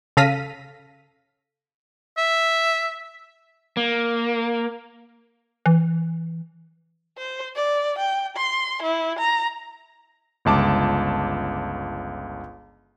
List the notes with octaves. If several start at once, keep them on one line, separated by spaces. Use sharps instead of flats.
C#3 A4 F5 A#6 B6 D#7
E5
A#3
E3
C5
D5
G5
C6
E4
A#5
G1 C#2 A5 D6